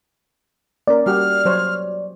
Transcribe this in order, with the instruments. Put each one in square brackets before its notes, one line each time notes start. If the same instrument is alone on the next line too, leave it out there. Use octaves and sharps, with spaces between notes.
[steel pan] A#3 C#4 A#4 [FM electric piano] D5
[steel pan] G3 F#4 G4 [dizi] F6
[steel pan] F#3 C5 C#5